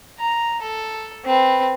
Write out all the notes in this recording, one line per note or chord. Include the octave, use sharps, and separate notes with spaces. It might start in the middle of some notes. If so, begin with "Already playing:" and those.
A#5
A4
C4 B4